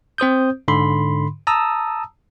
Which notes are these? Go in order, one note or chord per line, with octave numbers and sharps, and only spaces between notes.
C4 C5 D#6 G6
G#2 D3 B5 C6
A5 A#5 D#6 E6